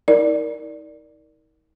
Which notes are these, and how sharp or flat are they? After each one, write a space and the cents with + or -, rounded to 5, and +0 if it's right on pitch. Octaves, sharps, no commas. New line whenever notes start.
D#4 +40 A#4 +5 D5 +0